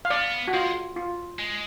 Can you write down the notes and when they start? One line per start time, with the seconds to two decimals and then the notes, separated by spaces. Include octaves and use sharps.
0.05 F5
0.10 B3 D5
0.48 F#4
0.54 G#3 F4
0.96 F4
1.39 G#3